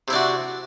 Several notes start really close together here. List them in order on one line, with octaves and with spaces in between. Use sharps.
C3 E4 D4 F#4